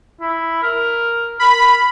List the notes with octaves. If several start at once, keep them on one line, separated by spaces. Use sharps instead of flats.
E4
A#4
A#4 B5